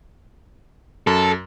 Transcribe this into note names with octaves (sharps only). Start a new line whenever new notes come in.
F#2 A4